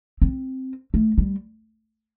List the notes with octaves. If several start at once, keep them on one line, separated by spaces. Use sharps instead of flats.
C4
A3
G3